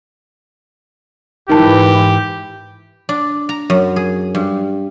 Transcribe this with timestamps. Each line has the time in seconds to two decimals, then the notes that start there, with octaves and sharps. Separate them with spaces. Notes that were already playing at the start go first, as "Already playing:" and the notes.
1.49 G#2 E3 D#4 G4 A#4 A5
3.09 D4
3.49 A#5
3.70 F#2
3.96 G#4
4.35 G2